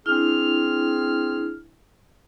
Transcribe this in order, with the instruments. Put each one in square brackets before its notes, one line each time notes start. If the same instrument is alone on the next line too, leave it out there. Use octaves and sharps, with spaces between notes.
[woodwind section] C4 G#4 F6 [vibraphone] D4 E4